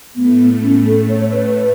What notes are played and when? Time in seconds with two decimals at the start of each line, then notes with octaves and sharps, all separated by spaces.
0.15 A2 A3 B3
0.62 C#4
0.85 A4
1.08 A2 A3 C#5
1.32 B4